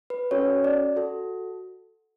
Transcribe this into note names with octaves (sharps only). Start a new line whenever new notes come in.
B4
C#4 F#4 A4 C#5
D5
F#4 A4